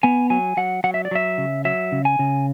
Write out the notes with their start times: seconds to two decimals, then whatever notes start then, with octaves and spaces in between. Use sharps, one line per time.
0.03 B3 G#5
0.30 F#3 G#5
0.57 F#3 F#5
0.84 F#3 F#5
0.94 E5
1.05 D5
1.11 F#3 E5
1.38 C#3
1.65 F#3 E5
1.92 C#3
2.05 G#5
2.19 C#3